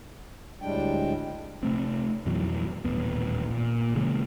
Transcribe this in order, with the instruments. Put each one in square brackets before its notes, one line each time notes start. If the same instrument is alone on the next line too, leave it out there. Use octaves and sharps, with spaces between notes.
[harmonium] D2 A2 G3 G#3 D4 G5
[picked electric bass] C3 A3 C4
F2 B2 E3 F#3
D#1 A1 A#2 B3
A#2
C#3 E3 G#3 A#3